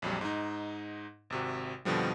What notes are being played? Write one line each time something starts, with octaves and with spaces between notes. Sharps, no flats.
A#1 F2 F#3 G3
G#2 D#4
G#1 C3 F#4
F2 B2 D3 F3 G3